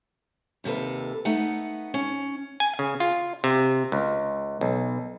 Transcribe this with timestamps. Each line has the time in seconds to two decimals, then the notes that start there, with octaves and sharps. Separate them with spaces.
0.64 D#2 C3 A#3 A4 B4
1.25 A3 B3 D#4 F#5
1.94 C#4
2.60 G#5
2.79 C#3
3.00 F4
3.44 C3
3.92 C#2
4.61 B1